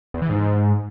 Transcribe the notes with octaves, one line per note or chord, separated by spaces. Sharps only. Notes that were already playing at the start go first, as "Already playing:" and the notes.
E2
E3
G#2